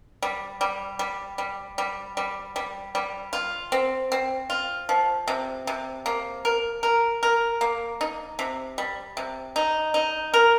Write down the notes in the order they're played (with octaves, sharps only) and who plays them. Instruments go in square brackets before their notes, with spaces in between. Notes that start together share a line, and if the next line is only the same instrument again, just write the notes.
[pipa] G3
G3
G3
G3
G3
G3
G3
G3
F4
C4
C4
F4
F3
C3
C3
A#3
A#4
A#4
A#4
A#3
D#4
C3
G3
C3
D#4
D#4
A#4